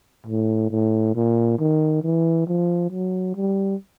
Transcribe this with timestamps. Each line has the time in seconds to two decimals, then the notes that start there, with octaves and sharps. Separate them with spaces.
0.27 A2
0.71 A2
1.15 A#2
1.59 D#3
2.03 E3
2.47 F3
2.91 F#3
3.35 G3